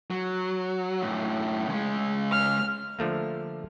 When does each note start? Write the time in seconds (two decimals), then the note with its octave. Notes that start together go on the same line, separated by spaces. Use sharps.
0.11 F#3
1.02 F#2 A2
1.69 C#3 G#3
2.31 F6
2.99 D3 F3 A3 A#3